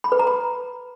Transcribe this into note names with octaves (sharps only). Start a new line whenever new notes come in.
B5
B4
A#5
B5